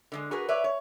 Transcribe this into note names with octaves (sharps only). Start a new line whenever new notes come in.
D3 G3 G#3
F#4 G#4 A#4 B4
B4 C#5 D5 E5
C#5